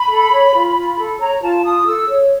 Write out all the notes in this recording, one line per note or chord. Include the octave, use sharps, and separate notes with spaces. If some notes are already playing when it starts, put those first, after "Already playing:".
Already playing: B5
A4
C#5
F4
F4
A4
C#5 A#5
F4 A5
F4 D#6
A4 E6
C#5